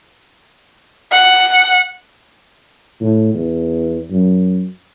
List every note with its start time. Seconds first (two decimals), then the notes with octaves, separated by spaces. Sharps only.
1.12 F#5
3.01 A2
3.34 E2
4.10 F#2